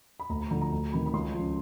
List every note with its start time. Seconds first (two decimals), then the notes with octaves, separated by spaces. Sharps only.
0.20 B5
0.29 D2 A#5
0.41 B5
0.51 D3 F3 A#5
0.62 A#5
0.72 D2 A#5
0.92 C3 D#3 B5
1.06 B5
1.13 C#2 C6
1.34 C#3 F3